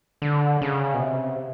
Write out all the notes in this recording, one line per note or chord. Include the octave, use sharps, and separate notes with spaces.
D3
C#3
B2
C3